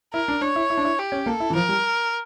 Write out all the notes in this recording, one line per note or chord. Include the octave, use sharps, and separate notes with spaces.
E4 A#4
D4
D4 C#5
E4
E4
D4
E4
G4
C#4
A#3 A4
E4
E3
F3 A#4
G3